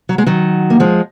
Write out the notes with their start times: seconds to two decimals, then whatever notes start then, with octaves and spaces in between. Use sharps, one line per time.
0.09 F#3
0.18 G#3
0.27 D#3 F#3
0.70 A#3
0.80 F3 G#3